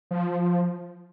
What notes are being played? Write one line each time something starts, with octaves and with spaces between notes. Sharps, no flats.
F3